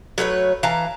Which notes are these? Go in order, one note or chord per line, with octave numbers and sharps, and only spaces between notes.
F#3 A3 B4 C#5
E3 F5 A5 A#5